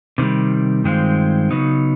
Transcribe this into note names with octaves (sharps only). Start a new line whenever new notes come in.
C3 D#3 G3
G2 D#3 G#3 C4 F4
C#3 F#3 B3 D#4